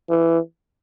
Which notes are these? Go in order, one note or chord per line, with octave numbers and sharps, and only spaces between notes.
E3